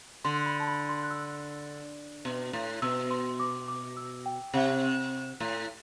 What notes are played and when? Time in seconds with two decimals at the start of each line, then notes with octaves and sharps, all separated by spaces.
0.25 D3 C6
0.46 B5
0.60 A5
0.68 B5
0.89 C6
1.03 F#6
1.10 E6
2.25 B2
2.53 A2
2.82 B2 E6
3.11 C6
3.28 C6
3.40 D6
3.68 D6
3.97 E6
4.26 G5
4.54 C3 F#5
5.40 A2